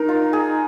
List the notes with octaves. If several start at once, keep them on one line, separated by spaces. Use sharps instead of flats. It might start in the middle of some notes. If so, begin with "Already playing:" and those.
Already playing: D#4 A#4
F4
G#4